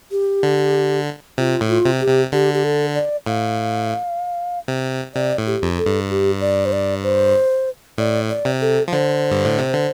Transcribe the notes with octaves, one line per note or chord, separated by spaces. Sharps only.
G4
D3
C3 F4
A2
F4
C3
G4
C3
D3 G4
G4
A4
D5
A2 F5
C3
C3 D5
A2
G4
F2
A4
G2
G4
D5
C5
D5
C5
A2 D5
D5
C3
A4
F3
D3 C5
G2
A2
C3
D3